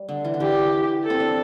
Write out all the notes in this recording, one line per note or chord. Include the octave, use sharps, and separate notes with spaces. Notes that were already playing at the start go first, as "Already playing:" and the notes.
Already playing: G3
D3
E3
D3
E3 G4
A4
C4
D4